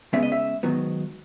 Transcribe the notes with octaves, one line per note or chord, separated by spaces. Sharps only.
C#3 G#3 B3 E5
D#5
E5
G#2 D#3 F#3 B3